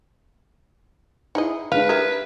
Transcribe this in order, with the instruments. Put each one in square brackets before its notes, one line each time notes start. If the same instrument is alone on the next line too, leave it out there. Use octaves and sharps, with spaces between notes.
[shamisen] D#4 G#4 D#5 [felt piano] E4
[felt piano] G#3 D4 [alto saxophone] B4 [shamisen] F5
[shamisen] G4 A#4 E5 [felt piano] F6 G#6